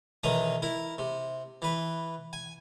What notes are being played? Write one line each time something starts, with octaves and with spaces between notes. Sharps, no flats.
B1 D#3 E3 A#5 D#6
E4 A#4
C3
E3 B4
G#5